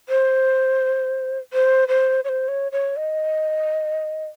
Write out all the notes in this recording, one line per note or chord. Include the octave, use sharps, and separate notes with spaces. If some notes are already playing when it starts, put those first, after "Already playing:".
C5
C5
C5
C#5
C5
C#5
C#5
D#5